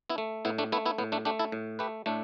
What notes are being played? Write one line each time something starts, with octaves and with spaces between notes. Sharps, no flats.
B3 E4
A3
A2 B3 E4
A3 D4
A3 B3 E4
B3 E4
A2 B3
A3 D4
A3 D4 G4
E4 A4
A2
A3 G4 B4
A2 A3 D4